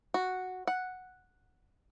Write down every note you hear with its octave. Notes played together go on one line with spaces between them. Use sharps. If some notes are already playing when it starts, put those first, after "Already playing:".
F#4
F#5